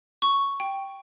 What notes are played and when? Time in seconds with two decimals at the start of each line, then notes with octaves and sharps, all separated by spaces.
0.22 C#6
0.60 G5